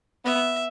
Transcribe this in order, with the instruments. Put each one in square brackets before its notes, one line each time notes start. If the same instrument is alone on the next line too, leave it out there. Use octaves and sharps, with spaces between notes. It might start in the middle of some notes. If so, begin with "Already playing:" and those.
[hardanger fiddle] B3 [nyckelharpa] E5